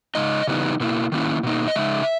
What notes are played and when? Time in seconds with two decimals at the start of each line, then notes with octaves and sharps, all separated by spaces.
0.15 C#3 G#3 D#4 D#5
0.47 C#3 E3 G3 B3 D#4
0.80 B2 A#3 E4
1.12 D#3 A#3 C#4 E4
1.43 B2 A#3 D#4
1.68 D#5
1.76 C#3 G#3 D#4 E5